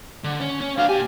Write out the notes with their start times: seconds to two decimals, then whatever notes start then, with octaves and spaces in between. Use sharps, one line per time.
0.24 D3
0.41 C#4
0.61 C#4
0.78 D4 F#4 F5
0.89 A#2 G4 G#5